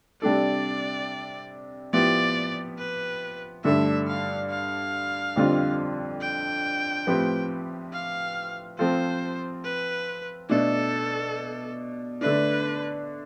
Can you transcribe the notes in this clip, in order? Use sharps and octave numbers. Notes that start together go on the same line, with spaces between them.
C3 G3 D4 A4 D5
F3 B3 E4 G4 D5
B4
G2 D3 A3 D4 A4 E5
F5
F5
F2 D3 G3 C4 F4
G5
A2 F3 C4 G4 B4
F5
F3 C4 F4 A4 C5
B4
B2 A3 D4 A4
D3 A3 D4 B4